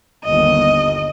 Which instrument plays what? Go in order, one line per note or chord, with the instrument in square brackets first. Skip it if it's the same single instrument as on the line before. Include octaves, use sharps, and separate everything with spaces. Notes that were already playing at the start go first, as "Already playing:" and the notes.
[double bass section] G1 D#2 [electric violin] D#5